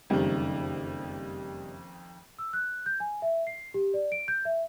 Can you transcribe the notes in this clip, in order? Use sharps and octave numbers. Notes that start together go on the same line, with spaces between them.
F#1 F2 D#3 G3
E6
F#6
G6
G#5
E5
C7
G4
D5
D7
G6
E5